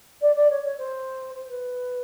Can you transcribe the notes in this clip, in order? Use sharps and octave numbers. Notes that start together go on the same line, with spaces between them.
D5
D5
C#5
C#5
C5
C5
B4